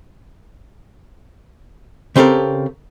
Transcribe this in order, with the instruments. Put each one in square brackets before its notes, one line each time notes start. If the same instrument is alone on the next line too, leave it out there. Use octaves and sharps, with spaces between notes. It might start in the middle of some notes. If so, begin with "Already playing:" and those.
[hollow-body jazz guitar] C#3 C4 G4 A4 A#4